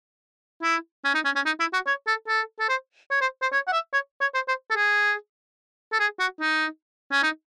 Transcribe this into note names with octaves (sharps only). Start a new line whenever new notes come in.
E4
C#4
D#4
C#4
C#4
D#4
E4
F#4
C#5
A4
A4
A4
C5
C#5
C5
C5
C#5
F#5
E5
C#5
C#5
C5
C5
A4
G#4
A4
G#4
F#4
D#4
C#4
D#4